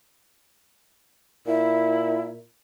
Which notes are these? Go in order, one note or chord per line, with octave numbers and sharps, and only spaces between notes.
A#2 E4